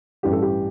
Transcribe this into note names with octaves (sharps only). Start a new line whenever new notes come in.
A1 G2 E3 G3 G4
A4
G4